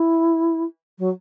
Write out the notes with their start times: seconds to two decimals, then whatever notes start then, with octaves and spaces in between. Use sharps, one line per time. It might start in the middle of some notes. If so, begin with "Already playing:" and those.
Already playing: E4
0.99 F#3